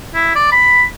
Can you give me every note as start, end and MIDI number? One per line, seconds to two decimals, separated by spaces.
0.14 0.33 64
0.35 0.47 74
0.52 0.85 83